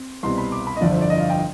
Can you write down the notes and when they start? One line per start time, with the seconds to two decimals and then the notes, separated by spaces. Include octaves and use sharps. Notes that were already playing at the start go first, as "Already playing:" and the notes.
Already playing: C4
0.23 C2 B2 G3 C4 C6
0.38 B5
0.52 D6
0.67 B5
0.77 D#5
0.81 G1 F2 D3 F3 D5
0.90 C5
1.01 D5
1.10 D#5
1.20 F5
1.29 G5